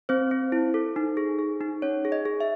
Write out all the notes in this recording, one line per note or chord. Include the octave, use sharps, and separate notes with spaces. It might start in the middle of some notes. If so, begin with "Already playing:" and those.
C4 C5
C4
E4
A4
D#4
G#4
G#4
D#4
C#4 C#5
G#4
D#5
G#4
E5